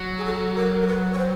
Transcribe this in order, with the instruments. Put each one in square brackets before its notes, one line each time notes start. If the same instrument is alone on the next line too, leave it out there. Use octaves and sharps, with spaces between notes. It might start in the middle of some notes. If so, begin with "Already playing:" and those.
Already playing: [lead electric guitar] F#3
[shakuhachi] G#4
A4
A#4
A#4
B4
C#5
C5